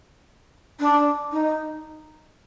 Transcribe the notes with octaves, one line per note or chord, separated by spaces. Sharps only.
D4
D#4